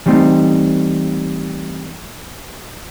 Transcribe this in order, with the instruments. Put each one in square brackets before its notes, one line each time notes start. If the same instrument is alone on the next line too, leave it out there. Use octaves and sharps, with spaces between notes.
[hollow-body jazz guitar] E3 G3 A3 C4 D#4